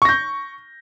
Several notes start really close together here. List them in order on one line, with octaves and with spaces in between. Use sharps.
C#6 A#6 G6